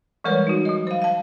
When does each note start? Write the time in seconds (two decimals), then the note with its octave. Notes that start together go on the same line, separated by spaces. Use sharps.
0.24 E3 G3 G#3 A#4 B4 C#5
0.47 D#4 F#4
0.65 F#3 D#5
0.87 C5 F5
1.02 F5 A5